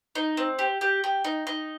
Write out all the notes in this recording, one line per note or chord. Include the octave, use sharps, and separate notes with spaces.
D#4
C4
G4
G4
G4
D#4
D#4